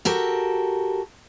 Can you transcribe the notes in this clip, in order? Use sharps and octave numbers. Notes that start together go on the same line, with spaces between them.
F#4 G4 A4 A#4